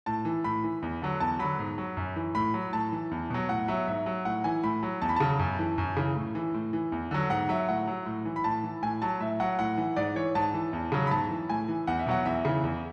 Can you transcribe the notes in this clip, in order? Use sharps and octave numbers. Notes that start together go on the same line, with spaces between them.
A2 A5
E3
A2 B5
E3
E2
D3 F#3
E2 A5
D3 F#3 B5
G#2
F#3
F#2
E3
A2 B5
F#3
A2 A5
E3
E2
B2 F#3
A2 F#5
F#3 E5
G#2 E5
F#3
A2 F#5
E3 G#5
A2 B5
F#3
E2 A5
B5
C#3 F#3 A5
F#2
E3
F#2
C#3 E3
A2
E3
A2
E3
E2
D3 F#3
G#2 F#5
F#3 E5
A2 F#5
F#3
A2
E3
B5
A2 A5
E3
A2 G#5
F#3 A5
A2 E5
F#3 F#5
A2 F#5
E3
G#2 D5
E3 C#5
G#2 A5
E3
E2
C#3 F#3
B5
G#2 A5
E3
A2 G#5
E3
E2 F#5
E5
B2 F#3 F#5
E2 E5
C#3 E3
E2